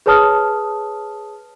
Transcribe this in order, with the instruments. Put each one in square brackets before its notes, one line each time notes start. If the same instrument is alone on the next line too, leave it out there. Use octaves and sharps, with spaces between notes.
[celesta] G#4 B4 C#5 A5 D#6 F6